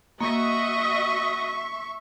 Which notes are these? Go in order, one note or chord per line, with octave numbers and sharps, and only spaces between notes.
A#3 F#4 D#5 E5 C#6